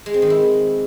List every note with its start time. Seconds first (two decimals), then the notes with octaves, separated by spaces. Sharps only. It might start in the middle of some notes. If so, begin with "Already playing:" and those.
0.06 G#3
0.14 C4
0.22 D#3
0.30 E4